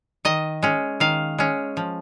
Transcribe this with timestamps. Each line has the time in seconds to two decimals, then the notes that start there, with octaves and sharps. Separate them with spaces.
0.25 D#3 D#5
0.63 G#3 C#4
1.00 D#3 F5
1.38 G#3 C#4
1.77 F3